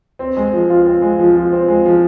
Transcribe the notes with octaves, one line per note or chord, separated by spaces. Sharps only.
C4
G#3
F3
F4
C4
G#3
F3
F4
C4
G#3
F3